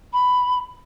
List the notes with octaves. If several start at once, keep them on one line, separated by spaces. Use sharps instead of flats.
B5